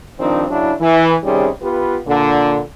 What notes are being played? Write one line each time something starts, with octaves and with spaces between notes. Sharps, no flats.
G2 D#3 F3 C4 D4 D#4
C#3 F#3 D4 E4
E3
C3 D#3 G3 C4 C#4 G#4
B3 F4 G4 B4
A#2 D3